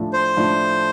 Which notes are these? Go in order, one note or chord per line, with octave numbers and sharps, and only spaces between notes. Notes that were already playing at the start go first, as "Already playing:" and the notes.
Already playing: A2 F3 A3 D4 A4
C5
A2 F3 A3 D4 A4